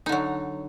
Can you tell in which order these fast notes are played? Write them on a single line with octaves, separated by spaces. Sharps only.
D#4 D3 F#3